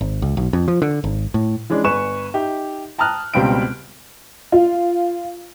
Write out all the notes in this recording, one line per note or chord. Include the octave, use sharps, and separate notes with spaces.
G#1
C#2
B1
F2
F3
D3
G#1
A2
E3 G#3 C#4 D4
G1 B4 G#5 C#6 E7
D#4 G4 E5
G5 A5 A#5 D#6 F6 F#6
C#2 B2 G3 C4 F5 D7
F4